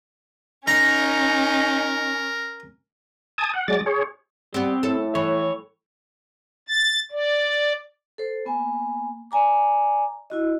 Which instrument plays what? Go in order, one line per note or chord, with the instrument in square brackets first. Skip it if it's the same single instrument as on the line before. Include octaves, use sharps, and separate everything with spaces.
[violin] C#4 [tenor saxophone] D#4 [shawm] A#4 [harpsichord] A#5
[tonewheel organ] G#5 A5 D#6
F#5
F#3 G#3 D5 A6
G#4 C#5
[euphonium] G3 [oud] B3 G4 [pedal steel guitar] C4
[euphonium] A2 [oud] A4
[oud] E3 [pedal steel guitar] C#5
[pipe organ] A6
D5
[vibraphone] A4 C5
A#3 B3 G#5
D5 G#5 A#5 D6
E4 F#4 D#5